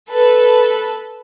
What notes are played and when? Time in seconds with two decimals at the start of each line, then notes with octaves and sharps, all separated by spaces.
0.10 A4 B4